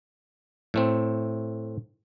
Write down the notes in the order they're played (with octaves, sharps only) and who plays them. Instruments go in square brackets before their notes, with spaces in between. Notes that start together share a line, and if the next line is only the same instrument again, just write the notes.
[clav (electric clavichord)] A2 A3 C4